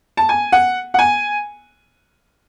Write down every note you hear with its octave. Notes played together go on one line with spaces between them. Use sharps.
A5
G#5
F#5
F#5
G#5